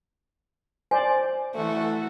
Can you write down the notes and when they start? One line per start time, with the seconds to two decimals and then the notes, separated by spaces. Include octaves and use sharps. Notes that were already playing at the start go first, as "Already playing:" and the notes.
0.91 C5 D5 G#5
1.55 E3 A3 F#4 A4